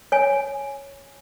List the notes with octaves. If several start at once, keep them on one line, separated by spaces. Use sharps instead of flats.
C#5 G#5